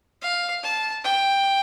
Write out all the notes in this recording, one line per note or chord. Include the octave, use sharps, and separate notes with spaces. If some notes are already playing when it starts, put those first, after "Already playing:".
F5
A5
G5